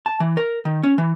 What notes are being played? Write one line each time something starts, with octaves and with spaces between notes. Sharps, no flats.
A5
E3
A#4
D#3
C#4
E3